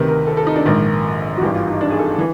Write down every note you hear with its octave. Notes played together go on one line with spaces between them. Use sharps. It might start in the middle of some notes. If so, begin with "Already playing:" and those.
Already playing: D2 C3 D#3 B4
A#4
A4
A4
D#4
D4
A#1 G#2 D#3
F#4
G#1 G2 E3 G4
F4
D#4
D4
G#4
A4
E3